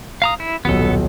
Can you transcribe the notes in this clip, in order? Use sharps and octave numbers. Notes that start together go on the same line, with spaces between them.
F5 A#5 D#6
E4
D#1 B1 B3 A4